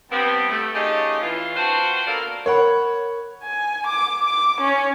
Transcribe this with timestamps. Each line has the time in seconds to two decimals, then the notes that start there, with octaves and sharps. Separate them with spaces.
0.11 G2 B3 C4
0.49 G3 A3
0.74 A3 C#4 D#4 F4 G4 G#4
1.22 E3 F4
1.56 C4 D4 F4 F#4 B4 C5
2.07 B2 A#3 A4 A#4 D5 F5
2.46 A#4 C#5 F#5 B5
3.43 G#5
3.87 D6
4.19 D6
4.61 C#4